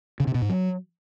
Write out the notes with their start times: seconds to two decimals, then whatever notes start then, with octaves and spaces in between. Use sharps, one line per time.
0.20 C#3
0.27 C3
0.35 B2
0.42 G#2
0.49 F#3